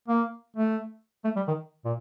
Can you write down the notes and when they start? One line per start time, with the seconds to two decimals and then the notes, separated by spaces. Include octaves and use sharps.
0.08 A#3
0.57 A3
1.25 A3
1.36 G3
1.48 D#3
1.85 A#2